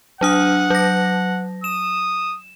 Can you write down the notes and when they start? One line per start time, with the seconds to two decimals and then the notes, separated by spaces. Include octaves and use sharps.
0.21 F#3 D4 F#5 D#6
0.70 F#3 A#6
1.64 D#6 E7